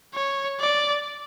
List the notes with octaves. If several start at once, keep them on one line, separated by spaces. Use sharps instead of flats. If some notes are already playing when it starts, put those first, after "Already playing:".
C#5
D5